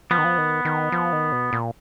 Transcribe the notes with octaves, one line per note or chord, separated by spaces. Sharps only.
F3 B3
D#3
F3
D#3
D#3
F3
D#3
B2
A#2